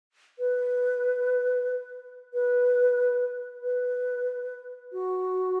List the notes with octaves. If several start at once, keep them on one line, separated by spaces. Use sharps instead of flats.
B4
B4
B4
F#4